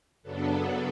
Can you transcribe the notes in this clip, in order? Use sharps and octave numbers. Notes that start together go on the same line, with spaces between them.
F#2 C#3 F#3 B3 D4 A4